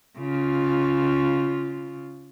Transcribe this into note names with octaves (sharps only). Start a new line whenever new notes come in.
C#3 F4